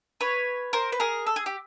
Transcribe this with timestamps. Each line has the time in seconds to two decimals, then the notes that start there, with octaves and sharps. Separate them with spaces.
0.21 B4 C#5
0.73 A#4 C5
0.92 B4
1.00 G#4 A#4
1.26 A4
1.36 G#4
1.46 G4